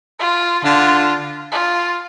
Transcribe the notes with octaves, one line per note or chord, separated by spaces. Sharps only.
F4
D3 F4
F4